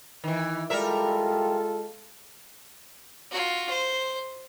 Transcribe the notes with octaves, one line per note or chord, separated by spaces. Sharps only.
D#3 E3
G3 G#3 F4 A4 A#4 E5
F4 F#4
C5